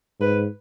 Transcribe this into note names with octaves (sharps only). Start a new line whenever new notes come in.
G#2 B4